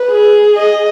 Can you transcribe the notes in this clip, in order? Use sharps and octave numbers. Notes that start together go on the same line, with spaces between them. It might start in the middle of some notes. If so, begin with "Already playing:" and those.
Already playing: B4
G#4
D#5